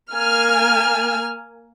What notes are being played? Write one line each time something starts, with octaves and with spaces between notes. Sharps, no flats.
A#3 G#5 F6